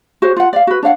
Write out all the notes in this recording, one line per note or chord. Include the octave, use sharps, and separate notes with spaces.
F#4 G#4 C5 C#5
F4 F#5
D5 F5
F#4 B4
D4 C#5 F5 F#5